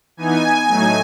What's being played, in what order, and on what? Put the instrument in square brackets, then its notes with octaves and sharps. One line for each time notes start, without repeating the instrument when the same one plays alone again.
[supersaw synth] E3 B3 D#4 G#5
A2 F#3 A3 D#4